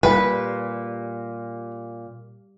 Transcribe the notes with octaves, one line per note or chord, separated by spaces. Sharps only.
A#2 G3 B4